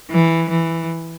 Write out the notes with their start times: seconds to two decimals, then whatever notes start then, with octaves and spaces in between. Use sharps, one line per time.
0.11 E3
0.50 E3